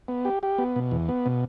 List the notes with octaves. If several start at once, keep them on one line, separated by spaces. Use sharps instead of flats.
B3
G4
G4
B3
B2
E2
B3
B2